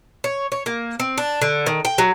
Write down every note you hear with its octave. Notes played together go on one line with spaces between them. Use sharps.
C#5
C#5
A#3
C4
D4
D3
D#3
G5
F#3